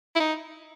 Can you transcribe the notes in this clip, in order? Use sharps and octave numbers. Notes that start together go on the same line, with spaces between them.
E4
D#4